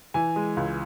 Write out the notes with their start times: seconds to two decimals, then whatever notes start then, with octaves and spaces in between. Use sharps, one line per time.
0.14 E3 G#5
0.36 G#3
0.57 C#2